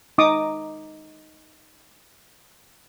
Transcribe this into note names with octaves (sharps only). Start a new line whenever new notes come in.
D#4 D6 D#6